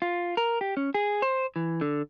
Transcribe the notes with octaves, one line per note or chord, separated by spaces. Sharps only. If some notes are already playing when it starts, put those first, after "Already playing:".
F4
A#4
G4
C#4
G#4
C5
E3
D3